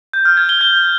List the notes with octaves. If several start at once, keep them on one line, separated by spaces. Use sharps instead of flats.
G6
F6
G#6
G7
G6